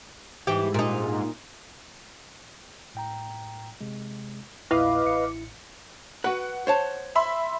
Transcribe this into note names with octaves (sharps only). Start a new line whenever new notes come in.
G#2 E3 G4
A#2 D#4
A2 G5 A#5
C3 G#3
A#1 E2 A#2 E4 B4 D#5 F5 D6
A1 A2 C#7
F#4 B4 F#5
C5 C#5 A5
E5 B5 C6